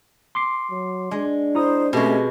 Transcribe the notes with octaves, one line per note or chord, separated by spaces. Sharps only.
C6 D6 C7
F#3
G#3 D4
E4 C5 A#5 D#6
B2 G#3 A3 C4 C#4 G4 G#4